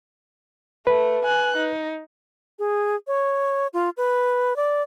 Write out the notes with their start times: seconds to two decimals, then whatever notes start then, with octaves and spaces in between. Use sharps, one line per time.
0.87 A3 B4
1.25 G#5 F#6
1.57 D#4
2.59 G#4
3.07 C#5
3.73 F4
3.97 B4
4.56 D5